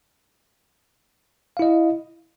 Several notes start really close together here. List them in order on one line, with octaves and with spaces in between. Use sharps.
F5 E4 D#5